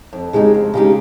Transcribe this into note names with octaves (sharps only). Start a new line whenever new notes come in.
F2
C#3 G#3 D#4 G4
F2
C#3 G#3 D#4 G4